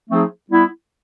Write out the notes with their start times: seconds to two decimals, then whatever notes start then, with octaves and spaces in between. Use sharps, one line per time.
0.10 F3 A3 C4 D#4 G#4
0.49 G3 B3 E4